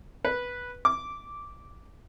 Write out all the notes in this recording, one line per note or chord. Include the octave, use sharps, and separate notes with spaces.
B4
D6